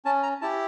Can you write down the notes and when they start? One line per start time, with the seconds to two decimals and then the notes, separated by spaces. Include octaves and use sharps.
0.05 C#4 A5
0.23 A#5
0.41 E4 G4 A5